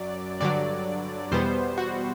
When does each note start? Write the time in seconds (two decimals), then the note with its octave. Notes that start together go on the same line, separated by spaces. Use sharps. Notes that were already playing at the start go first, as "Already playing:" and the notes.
Already playing: F#2 F#3 D5
0.40 G2 D3 F#3 D5
1.32 E2 B2 G3 B3 C5
1.78 F#4